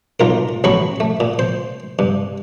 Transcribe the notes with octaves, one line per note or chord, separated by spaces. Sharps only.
B1 F4 A#4
A1 F#3 B5 C#6
A3
A#2
C5
G2